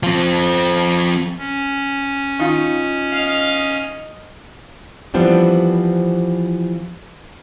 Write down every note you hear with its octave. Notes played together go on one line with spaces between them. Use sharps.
F3 C4
C#4
D#3 D#4 F4
D#5 F5
E3 F3 G3 B3 C4 D4